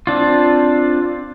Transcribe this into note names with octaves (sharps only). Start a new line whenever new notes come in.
C4 D4 F4